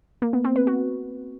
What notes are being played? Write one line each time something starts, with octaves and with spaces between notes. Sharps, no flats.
A#3
B3
C4
B4
F#4